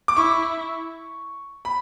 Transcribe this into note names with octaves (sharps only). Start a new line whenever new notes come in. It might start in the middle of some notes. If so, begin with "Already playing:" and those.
D6
E4 C#6
B5